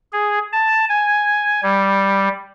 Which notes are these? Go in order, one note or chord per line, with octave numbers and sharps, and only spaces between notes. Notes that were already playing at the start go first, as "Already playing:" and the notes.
G#4
A5
G#5
G3